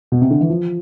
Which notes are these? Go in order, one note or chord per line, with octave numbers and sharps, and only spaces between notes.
B2
C3
D3
E3
F3